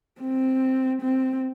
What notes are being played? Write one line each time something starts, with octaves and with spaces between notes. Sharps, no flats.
C4
C4